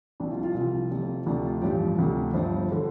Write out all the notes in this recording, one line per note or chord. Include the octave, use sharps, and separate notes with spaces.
C2 C3 F3 D4
F4
F4
C2 C3 F3
F1 F2 C3 F3
D2 C3 F3 D4
F4
A1 G2 F3 G4
D2 C3 F3
G1 G2 F3 C5
D3 F3